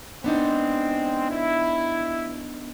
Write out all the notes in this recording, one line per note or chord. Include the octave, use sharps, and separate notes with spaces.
G#3 B3 C4 D4 D#4
E4